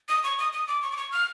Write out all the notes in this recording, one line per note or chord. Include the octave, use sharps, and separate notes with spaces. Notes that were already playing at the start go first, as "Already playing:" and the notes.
D#6
C#6
D#6
D#6
D6
C#6
D6
C#6
F6